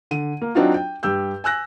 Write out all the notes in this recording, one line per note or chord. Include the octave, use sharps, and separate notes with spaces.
D3 D#7
A#3
F#3 C4 D4 D#4 F4 F#4
G5
G2 G4 E6 G6
G#5 E6 F#6 A#6